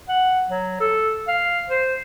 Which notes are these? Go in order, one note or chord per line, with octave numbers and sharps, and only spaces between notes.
F#5
F#3
A4
F5
C5